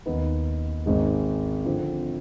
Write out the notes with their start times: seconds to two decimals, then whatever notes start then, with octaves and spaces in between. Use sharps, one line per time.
0.06 D#2 D#3 B3 D#4
0.86 G#1 G#2 D#3 G#3
1.65 D3 F3 C4